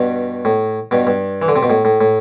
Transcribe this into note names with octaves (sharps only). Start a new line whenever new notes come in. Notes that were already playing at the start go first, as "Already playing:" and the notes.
Already playing: G2 B2
A2
G2 B2
G2
E3
D3
C3
B2
A2
A2
A2